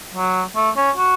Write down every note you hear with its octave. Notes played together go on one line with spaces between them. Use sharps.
F#3
A3
C#4
F#4